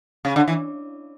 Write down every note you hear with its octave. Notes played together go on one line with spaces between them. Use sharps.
C#3
D3
E3